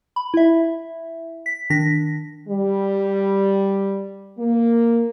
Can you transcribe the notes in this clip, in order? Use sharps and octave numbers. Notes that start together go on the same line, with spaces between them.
B5
E4 E5
B6
D#3 D4 A#6 B6
G3
A#3